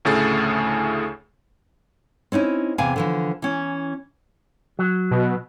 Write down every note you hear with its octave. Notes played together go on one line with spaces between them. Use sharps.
D2 A2 C#3 A3 G#4 A6
C4 C#4 D#4 E4
E2 C3 E3 F5 G#5
D3 E3 F3
E3 C#4
F#3
B2